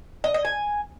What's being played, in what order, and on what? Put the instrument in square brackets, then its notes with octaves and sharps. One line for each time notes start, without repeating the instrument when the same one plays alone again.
[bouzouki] D#5
D#5
G#5